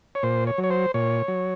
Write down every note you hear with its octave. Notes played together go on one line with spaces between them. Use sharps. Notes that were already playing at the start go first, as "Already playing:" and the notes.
C#5
A#2 C5
C#5
F#3
C#5
C5
A#2 C#5
F#3